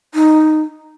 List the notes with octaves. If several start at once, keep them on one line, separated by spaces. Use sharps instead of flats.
D#4